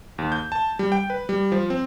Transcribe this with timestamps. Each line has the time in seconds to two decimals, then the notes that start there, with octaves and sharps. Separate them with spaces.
0.18 D#2
0.32 G6
0.52 A5
0.79 G3
0.92 G5
1.10 B4
1.29 G3
1.52 F3
1.70 C4